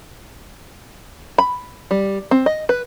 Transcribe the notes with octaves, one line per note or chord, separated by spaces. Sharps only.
B5
G3
C4
D#5
B4